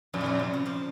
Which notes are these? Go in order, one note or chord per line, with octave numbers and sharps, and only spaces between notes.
F2 A#2
D#3
C#3
C3
C#3
C#3 F3